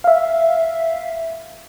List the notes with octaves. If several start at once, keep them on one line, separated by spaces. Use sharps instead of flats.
E5 F5